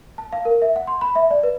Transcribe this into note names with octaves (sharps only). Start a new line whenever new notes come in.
A5
F5
A#4
E5
F#5
C6
B5
E5
D5
B4